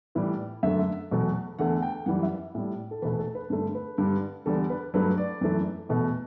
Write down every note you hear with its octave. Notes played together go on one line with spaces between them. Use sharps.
A2 E3 G3
F#2 D3 A3 E5
E2 B2 F#3 A3
E2 D3 A3 F#5
G5
F#2 E3 G3 F#5
E5
A2 G3
A4
E2 B2 A3 B4
A4
B4
G2 D3 A3
B4
G2 D3 G3
E2 D3 G3 A4
B4
G2 F#3 A3 B4
D5
F#2 E3 A3
E2 B2 A3